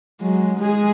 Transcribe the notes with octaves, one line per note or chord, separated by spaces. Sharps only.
F#3 G#3
G#3 G#4